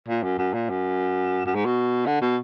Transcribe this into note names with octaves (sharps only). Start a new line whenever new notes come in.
A#2
F#2
F#2
A#2
F#2
F#2
G#2
B2
D3
B2